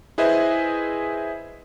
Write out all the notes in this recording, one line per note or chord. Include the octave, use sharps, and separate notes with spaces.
E4 G#4 B4 C5 D#5 E5